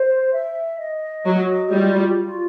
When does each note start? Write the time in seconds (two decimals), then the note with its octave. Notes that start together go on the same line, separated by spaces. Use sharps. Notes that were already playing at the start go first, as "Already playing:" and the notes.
Already playing: C5
0.32 E5
0.79 D#5
1.26 F#3 F#4
1.72 G3 F4
2.19 F4